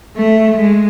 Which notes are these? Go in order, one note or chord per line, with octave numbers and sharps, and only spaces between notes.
A3
G#3